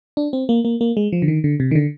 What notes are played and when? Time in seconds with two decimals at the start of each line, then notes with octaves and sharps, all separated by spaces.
0.17 D4
0.33 C4
0.49 A#3
0.65 A#3
0.81 A#3
0.97 G#3
1.13 F3
1.22 D3
1.28 D#3
1.44 D3
1.60 C3
1.71 D#3
1.75 D3